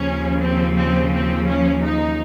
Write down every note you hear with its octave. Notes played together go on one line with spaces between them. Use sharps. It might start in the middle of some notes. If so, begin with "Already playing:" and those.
Already playing: D#2 C#3 F3 C#4
C4
C4
C4
C#4
D#4